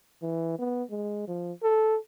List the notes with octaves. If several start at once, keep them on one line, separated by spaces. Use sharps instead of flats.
E3
B3
G#3
F3
A4